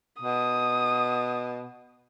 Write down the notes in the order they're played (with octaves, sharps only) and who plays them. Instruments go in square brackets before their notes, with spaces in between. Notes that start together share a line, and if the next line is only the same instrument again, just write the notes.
[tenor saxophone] B2 [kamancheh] D#6